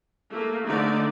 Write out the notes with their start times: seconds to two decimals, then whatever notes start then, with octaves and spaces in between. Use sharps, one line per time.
0.29 A3 A#3
0.64 D3 A3 D#4 D5